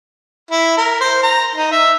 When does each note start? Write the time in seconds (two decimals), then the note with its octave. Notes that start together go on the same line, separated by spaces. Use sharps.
0.51 E4
0.77 A#4
1.00 C5
1.23 A#5
1.55 D#4
1.72 E5